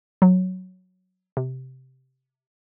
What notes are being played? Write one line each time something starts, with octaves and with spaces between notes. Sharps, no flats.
F#3
C3